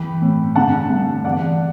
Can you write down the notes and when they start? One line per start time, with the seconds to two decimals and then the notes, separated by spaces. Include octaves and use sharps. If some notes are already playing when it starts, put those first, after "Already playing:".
Already playing: E3 G5 B5
0.22 A2
0.55 D3 F#5 A5
0.90 G2
1.24 E3 D5 F#5